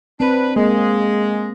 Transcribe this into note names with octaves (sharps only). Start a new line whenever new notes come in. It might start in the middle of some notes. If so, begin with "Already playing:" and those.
C4 D4 B4
G#3 A#3